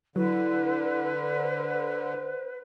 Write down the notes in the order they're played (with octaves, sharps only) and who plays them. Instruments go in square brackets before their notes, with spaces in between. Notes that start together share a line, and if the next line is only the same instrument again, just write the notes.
[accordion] D3 [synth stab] F#3 [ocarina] E4 [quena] B4
[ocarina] C5